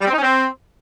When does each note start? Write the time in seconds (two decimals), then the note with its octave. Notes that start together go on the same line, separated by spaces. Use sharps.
0.01 G3
0.06 C4
0.12 D#4
0.17 C#4
0.22 C4